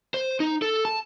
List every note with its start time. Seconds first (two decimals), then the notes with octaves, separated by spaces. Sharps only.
0.14 C5
0.40 D#4
0.62 A4
0.85 A5